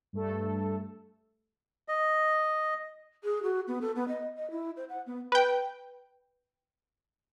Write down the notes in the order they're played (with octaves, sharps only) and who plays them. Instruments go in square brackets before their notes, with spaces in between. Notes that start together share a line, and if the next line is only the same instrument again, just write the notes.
[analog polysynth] G2 A3 A4
[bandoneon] D#5
[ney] G#4
F#4
B3
A4
B3
D#5
D#5
E4
C5
F#5
B3
[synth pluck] B4 G5